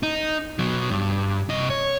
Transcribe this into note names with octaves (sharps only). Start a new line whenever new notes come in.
D#4
B2 F#3
G2
C3 D#5
C#5